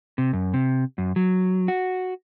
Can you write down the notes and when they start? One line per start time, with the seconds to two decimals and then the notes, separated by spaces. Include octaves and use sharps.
0.18 C3
0.33 F#2
0.54 C3
0.98 F#2
1.16 F#3
1.68 F#4